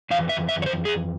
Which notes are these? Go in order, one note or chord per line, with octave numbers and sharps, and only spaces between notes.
F2 E3 F5
E5
E5
C#5
C5
G#4